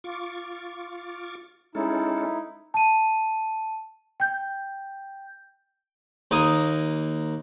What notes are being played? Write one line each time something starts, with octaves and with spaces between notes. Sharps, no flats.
F4 C#6 D6
G#3 C#4 D#4 E4 A4
A5 D#7
G5 G6
D#2 A#3 D#6